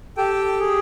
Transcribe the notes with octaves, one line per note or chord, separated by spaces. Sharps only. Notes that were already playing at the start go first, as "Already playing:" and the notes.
G4 A4 G5
G#4